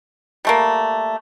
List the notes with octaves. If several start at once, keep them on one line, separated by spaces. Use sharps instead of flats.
G3 A3 A#3